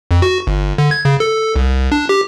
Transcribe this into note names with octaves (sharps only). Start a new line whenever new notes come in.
F2
F#4
G1
D3
G#6
C#3
A4
C2
D4
G4